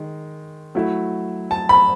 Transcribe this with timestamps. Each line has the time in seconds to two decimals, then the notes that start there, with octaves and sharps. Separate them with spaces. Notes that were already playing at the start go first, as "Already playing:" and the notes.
Already playing: D#3 G#3
0.75 F#3 A3 E4
1.51 A5
1.69 B5